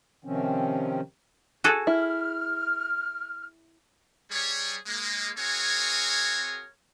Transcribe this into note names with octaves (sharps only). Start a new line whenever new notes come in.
C3 D#3 F3 C4 C#4
F#4 G#4 A4
E4 F6
G3 G#4 C#5
G#3 A#3
C4 F#4 G#4 A#4 C#5 G#5